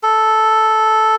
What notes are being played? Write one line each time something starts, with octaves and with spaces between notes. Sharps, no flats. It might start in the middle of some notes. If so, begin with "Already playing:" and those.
A4